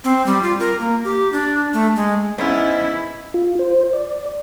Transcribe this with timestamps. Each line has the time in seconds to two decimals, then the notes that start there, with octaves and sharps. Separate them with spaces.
0.04 C4
0.26 G3
0.43 F4
0.60 A#4
0.80 A#3
1.04 G4
1.32 D4
1.74 A3
1.96 G#3
2.38 G#2 B3 C#4 E4
3.34 F4
3.59 C5
3.93 D5